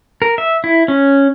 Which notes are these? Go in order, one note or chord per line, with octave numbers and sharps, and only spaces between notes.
A#4
E5
E4
C#4